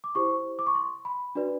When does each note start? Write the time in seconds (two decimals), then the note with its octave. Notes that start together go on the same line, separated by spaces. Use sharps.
0.04 D6
0.15 E4 G4 C5 C#6
0.59 D6
0.67 C#6
0.75 C6
1.05 B5
1.35 D4 F#4 B4 D5